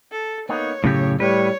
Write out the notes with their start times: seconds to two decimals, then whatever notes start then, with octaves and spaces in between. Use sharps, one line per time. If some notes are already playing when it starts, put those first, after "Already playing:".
0.12 A4
0.49 A#3 B3 D#4 C#5
0.84 F#2 A2 C#3 G4
1.20 A2 G3 B4 C#5